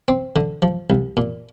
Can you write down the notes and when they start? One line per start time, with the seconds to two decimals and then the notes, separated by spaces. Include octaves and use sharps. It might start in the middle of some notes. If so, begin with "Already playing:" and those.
0.08 C4
0.36 D3
0.62 F3
0.90 C2
1.17 A#2